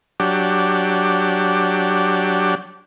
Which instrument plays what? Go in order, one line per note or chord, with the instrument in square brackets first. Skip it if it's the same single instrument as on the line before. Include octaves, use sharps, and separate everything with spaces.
[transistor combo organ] F#3 D4 G4